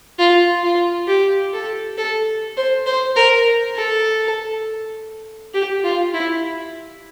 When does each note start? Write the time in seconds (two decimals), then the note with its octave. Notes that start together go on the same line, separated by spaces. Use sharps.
0.19 F4
0.64 F4
1.08 G4
1.53 A4
1.98 A4
2.57 C5
2.86 C5
3.17 A#4
3.76 A4
5.54 G4
5.84 F4
6.14 E4